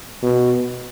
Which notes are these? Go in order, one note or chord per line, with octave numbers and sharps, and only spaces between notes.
B2